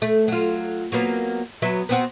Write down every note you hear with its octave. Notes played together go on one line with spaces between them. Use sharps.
A3
F#3 F4
F#3 A#3 B3
F#3 B3 E5
B3 C4 F#4